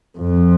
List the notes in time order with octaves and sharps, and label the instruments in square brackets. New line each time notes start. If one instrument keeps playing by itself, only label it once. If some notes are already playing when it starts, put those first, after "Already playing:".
[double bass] F2